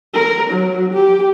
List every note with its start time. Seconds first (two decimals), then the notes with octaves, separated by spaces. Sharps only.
0.14 A#4
0.49 F#3
0.93 G4